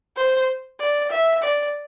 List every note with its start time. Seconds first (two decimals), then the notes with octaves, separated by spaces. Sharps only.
0.17 C5
0.80 D5
1.11 E5
1.43 D5